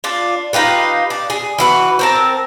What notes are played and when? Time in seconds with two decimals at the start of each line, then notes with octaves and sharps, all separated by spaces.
0.04 D4 F4
0.53 D#4 F4 G4 B4
1.10 D4
1.30 G#4
1.58 E3 F#4 B4
1.99 C4 A#4 A5